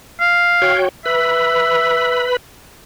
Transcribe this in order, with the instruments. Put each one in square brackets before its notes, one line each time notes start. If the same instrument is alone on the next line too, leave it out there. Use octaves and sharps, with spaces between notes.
[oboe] F5
[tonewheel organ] F#4 C#5 G5
[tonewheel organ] B4 B5 [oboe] E5